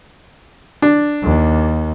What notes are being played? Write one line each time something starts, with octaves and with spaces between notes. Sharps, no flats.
D4
D#2